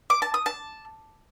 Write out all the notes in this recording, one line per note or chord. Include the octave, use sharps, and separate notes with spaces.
D6
A5
D#6
A5